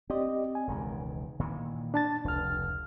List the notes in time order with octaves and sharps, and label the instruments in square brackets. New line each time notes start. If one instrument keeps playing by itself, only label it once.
[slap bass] C4 [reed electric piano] G4 D5 D#5
[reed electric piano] G#5
[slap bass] E1 C#2 D#3
A#2 D#3 E3
[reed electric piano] D4 A5 A6
[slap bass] F1 [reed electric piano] C#2 F6